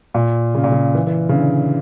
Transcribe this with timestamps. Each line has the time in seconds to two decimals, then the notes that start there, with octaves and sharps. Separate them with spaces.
0.14 A#2
0.55 C#3
0.64 A#2
0.72 C#3
0.95 E3
1.07 E3
1.29 C#3
1.34 D3